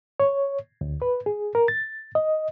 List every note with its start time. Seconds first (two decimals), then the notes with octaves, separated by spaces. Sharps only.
0.20 C#5
0.81 D2
1.02 B4
1.26 G#4
1.55 A#4
1.68 A6
2.15 D#5